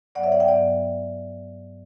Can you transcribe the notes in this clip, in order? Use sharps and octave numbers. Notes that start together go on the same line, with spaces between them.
G2 F#3 B3 D5 F#5
C#5 E5
D5 F#5
E5 G5
G2 F#3 B3 D5 F#5